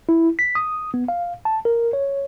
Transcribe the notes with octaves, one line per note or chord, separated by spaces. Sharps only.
E4
B6
D#6
B3
F5
A5
A#4
C#5